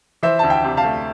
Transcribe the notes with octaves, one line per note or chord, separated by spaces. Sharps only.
E3 C5 E5
D2 A5
E5 G5
C3
F5 A5
A3